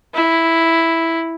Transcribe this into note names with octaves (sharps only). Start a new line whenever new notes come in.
E4